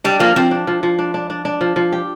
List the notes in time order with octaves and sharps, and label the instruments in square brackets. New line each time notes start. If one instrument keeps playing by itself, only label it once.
[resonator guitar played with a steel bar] G3 [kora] D4
[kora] F3 [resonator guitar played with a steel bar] A#3
[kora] F3 [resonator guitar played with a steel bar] C4
[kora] D4
F3
F3
D4
D4
D4
D4
F3
F3
G4